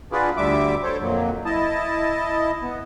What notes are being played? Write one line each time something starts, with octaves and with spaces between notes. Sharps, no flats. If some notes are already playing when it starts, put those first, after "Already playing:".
D4 F4 F#4 G#4 B4 D5
D2 D3 G3 E5 D6
A4 C5 C#5
F2 A#2 F#3
E4 D#5 A5
B3